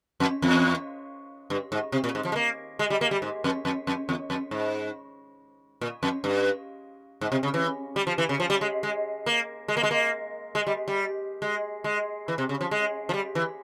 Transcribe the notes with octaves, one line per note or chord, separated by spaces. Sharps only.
F2
E2
G2
G#2
C3
A#2
G#2
F3
G#3
A#3
G#3
G3
A#3
G3
G#2
F2
F2
F2
E2
F2
G#2
A#2
F2
G2
G#2
C3
C#3
E3
G3
F3
E3
C#3
F3
G3
G#3
G#3
A#3
G#3
A#3
G#3
A#3
G#3
G3
G3
G#3
G#3
E3
C3
C#3
F3
G#3
F3
G3
E3